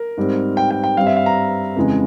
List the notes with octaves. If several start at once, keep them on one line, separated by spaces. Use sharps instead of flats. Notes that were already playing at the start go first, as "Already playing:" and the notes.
Already playing: A#4
G#2 G3 C4
G5
G5
G5
G2 G3 C4 F5
E5
F5
A#5
F2 C#3 E3 G#3